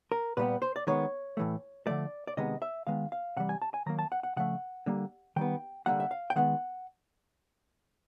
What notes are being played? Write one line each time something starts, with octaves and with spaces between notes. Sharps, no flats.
A#4
A#2 G3 B3 B4
C5
D5
D#3 G#3 B3 C#5
A2 E3 A3
D3 F3 A3 D5
D5
C3 D#3 G#3 B3 D#5
E5
D#3 G#3 B3 F5
F5
C3 E3 G3 F#5
G#5
A5
G#5
D#3 F#3 A#3 A#5
A5
F#5
F#5
C#3 F3 A3 F#5
D3 G3 A#3
D#3 G3 B3 G5
D3 G3 A#3 F#5
E5
F5
G5
D#3 G#3 B3 F#5